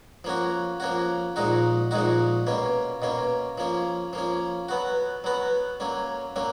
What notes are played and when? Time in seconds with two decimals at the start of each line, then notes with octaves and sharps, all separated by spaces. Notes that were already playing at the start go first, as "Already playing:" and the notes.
0.24 F3 A#3 C#4 F#4
0.80 F3 A#3 C#4 F#4
1.36 A#2 F3 G#3 D#4 F#4
1.91 A#2 F3 G#3 D#4 F#4
2.47 B2 A#3 C#4
3.02 B2 A#3 C#4
3.58 F3 A#3 C#4
4.13 F3 A#3 C#4
4.69 F#3 B3 F#4
5.24 F#3 B3 F#4
5.80 F#3 A#3 C#4
6.36 F#3 A#3 C#4